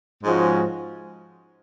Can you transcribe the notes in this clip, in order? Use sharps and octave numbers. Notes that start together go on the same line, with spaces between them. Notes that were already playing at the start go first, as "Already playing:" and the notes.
G#2 F3 G#3 C#4 F#4